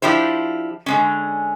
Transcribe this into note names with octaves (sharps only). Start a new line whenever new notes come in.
F3 D4 E4 G4 C5
D3 G#3 C#4